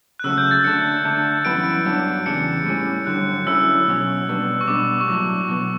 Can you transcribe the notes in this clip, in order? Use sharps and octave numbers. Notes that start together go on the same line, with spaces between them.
F#6
C#3 F#3 A3 E6
G6
A6
D3 A3 D4 C#7
D3 A3 D4
F#2 E3 G3 B3 E4 D7
G2 F#3 B3 D4
E2 C#3 G3 D4 C#7
A2 G3 C#4
G2 D3 F#3 F#6
D3 F#3 C#4 E4 E6
B2 F#3 C#4
B2 G3 B3 D4
C#6
B2 G3 D4 D6
C#6
A2 F#3 A3 D4 D6
B2 F#3 B3